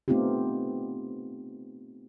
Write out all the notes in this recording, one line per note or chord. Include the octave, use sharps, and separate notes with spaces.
A3 B3 C4 D#4 F4 G4